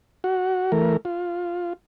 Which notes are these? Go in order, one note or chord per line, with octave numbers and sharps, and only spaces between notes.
F#4
E3 A3 A#4
F4